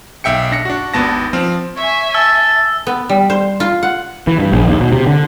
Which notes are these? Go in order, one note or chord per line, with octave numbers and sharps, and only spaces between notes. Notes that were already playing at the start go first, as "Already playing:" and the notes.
B1 E5 G5 C#7
D4 A#6 C#7
D4 F#4
G#1 D#2 B3 A5 A#6
F3 C4
C#5 E5 G#5
A5 E6
B3
G3
C5
F4
F#5
E3
G2
A#1
D#2
B2
C3
D3